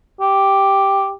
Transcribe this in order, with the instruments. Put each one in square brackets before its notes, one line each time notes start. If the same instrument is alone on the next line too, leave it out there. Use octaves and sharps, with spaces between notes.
[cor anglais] G4